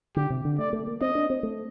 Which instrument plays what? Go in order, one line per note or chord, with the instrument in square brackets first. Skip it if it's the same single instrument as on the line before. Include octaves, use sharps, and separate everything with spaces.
[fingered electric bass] D3 [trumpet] G4
[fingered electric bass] C3
D3
[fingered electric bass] A3 [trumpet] D5
[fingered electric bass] A3
A#3
[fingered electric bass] C4 [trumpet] D#5
[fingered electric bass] D4
C4
A3